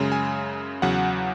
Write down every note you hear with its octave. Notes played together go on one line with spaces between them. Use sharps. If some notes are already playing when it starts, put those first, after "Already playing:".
Already playing: F#2 C#3 G#3
G#5
E2 C#3 F#3 F#5